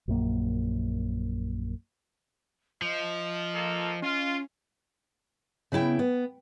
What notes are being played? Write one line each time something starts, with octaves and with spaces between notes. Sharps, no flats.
A#1 F#2 A#3
F3 D#5
A#3 F4 A4
C#4 F4
C#3 B3 E4 G5
B3